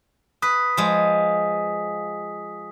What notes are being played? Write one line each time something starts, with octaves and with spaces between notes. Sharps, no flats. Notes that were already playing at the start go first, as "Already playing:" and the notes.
B4 D#6 B6
F3 G#3